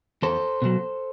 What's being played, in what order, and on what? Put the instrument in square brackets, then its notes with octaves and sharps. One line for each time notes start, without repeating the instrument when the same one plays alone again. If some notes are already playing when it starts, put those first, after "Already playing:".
[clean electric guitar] E2 A4 C5
B2 F#3